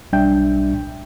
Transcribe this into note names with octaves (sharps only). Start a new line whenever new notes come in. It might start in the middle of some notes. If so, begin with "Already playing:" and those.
B1 G3 D4 E5 G5 G6